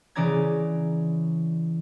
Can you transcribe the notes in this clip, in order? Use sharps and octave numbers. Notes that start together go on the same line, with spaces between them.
C#3 E3 C#4 D5 A#5 G#6